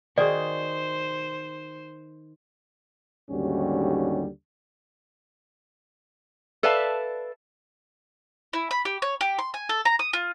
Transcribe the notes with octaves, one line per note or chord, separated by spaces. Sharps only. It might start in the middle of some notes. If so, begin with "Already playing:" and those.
D#3 F#4 G#4 C5 D5
D#2 G#2 D3 G3 C#4 F#4
A4 B4 D5 E5 F5 A5
E4
B5
G4
C#5
G4
C6
G#5
A4
A#5
D#6
F4